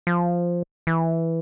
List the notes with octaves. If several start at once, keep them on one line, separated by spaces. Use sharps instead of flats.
F3
E3